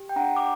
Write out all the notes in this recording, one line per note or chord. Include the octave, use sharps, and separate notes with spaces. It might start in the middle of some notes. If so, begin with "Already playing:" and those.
Already playing: G4
G5
D4 F#5 A#5
D6